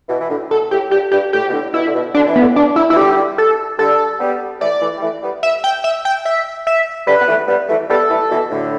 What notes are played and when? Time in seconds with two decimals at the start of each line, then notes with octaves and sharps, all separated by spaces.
0.09 B2 E3
0.20 E3
0.30 A2 D3
0.51 B2 A4
0.71 A2 G4
0.91 G2 G4
1.11 G2 G4
1.33 A2 G4
1.48 B2
1.53 A2 D3
1.73 B2 E4
1.87 D3
1.94 B2
2.14 D3 D4
2.28 E3
2.36 B3
2.41 A2 D3
2.56 D4
2.76 E4
2.90 E3 E4
2.97 D3 G3 G4
3.38 A4
3.79 D3 G3 A4
4.20 G3 B3
4.61 E3 A3 D5
4.81 E3 A3
4.97 G3
5.02 E3 A3
5.23 G3 B3
5.43 E5
5.64 G5
5.84 E5
6.05 G5
6.25 E5
6.67 E5
7.07 D3 G3 B4
7.21 B3
7.28 E3 A3
7.48 G3 B3
7.69 E3 A3
7.90 G3 B3 A4
8.10 E3 A3
8.31 B2 E3
8.51 A2 D3